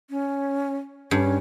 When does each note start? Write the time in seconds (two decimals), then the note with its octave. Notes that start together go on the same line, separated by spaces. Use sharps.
0.10 C#4
1.11 G2 C#4